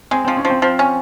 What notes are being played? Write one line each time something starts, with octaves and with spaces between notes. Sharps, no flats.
G#3 C4
F3 C4
C#4
F3
C4
F3
C#4